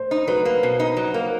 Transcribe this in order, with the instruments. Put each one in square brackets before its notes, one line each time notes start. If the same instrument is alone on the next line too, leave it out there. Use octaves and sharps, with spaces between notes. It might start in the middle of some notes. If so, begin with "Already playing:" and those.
Already playing: [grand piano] C5
[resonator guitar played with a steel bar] D#4
[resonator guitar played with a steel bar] F#3 [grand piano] B4
[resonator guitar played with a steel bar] A#3
B2
D#4
F#3
A#3